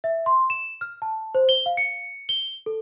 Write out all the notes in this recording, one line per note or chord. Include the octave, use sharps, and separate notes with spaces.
E5
C6
E7
F6
A5
C5
G7
F5
C#7
G7
A4